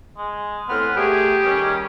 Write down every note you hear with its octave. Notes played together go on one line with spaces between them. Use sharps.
G#3
A2 B3 C4 F6
A3 G4 G#4
D#3 G3 C#4